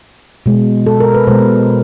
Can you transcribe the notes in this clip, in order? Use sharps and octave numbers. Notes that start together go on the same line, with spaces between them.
B2 G#3
A4
A#4
B4
B2 G#3 C5